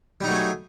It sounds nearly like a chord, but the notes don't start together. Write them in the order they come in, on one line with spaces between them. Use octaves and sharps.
G3 D#4 F#3 A3 G#4